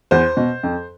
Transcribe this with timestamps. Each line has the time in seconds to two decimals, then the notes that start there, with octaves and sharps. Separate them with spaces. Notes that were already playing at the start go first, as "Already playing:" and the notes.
0.11 E2 C5
0.37 B2
0.63 F2